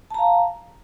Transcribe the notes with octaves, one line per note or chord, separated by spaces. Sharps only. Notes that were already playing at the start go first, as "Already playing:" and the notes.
F5 A5 A#5